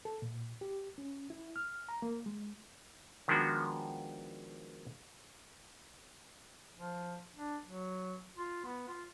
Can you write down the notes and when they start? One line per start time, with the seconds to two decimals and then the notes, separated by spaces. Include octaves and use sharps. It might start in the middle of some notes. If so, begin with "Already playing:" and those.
0.05 A4
0.22 A#2
0.61 G4
0.98 C#4
1.30 E4
1.56 F6
1.89 A#5
2.02 A#3
2.26 G#3
3.28 D#3 F3 G#3 B3 D4 F#4
6.77 F3
7.35 D4
7.65 F#3
8.38 F4
8.64 B3
8.88 F4